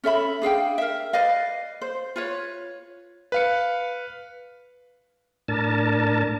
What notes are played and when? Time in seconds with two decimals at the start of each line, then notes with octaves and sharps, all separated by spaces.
0.04 C#4 A4 E5 B5
0.42 D4 G#4 F5 G5
0.78 A#4 E5
1.13 B4 D5 D#5 F5
1.82 C5
2.16 F4 B4 C#5
3.32 B4 F5 C#7
5.48 A2 D4 A#4 A5